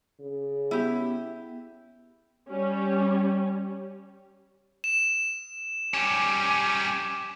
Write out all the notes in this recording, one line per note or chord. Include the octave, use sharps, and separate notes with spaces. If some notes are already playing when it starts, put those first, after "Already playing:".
C#3
B3 E4 G4
G3 C#4
E7
G3 C#4 G4